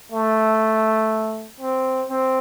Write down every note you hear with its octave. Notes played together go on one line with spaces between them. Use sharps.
A3
C4
C4